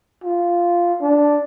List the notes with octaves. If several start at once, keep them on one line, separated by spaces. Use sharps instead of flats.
F4
D4